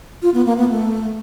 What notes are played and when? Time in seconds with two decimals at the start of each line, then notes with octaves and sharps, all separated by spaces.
0.22 F4
0.34 B3
0.46 A#3
0.58 B3
0.69 A3